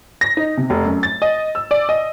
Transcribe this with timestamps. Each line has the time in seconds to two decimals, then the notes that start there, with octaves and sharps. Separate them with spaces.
0.21 A#6
0.37 D#4
0.57 C3
0.70 F1
0.85 F#2
1.03 A6
1.22 D#5
1.55 E6
1.71 D5
1.89 D#5